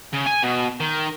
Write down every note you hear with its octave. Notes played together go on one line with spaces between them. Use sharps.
C#3
G#5
B2
D#3